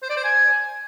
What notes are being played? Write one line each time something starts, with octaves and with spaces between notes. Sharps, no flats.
C5
D5
C5
G#5